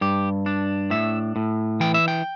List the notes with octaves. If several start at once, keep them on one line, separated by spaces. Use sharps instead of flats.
G2 G4
D4
A2 E5
A2
E3 G5
E5
G5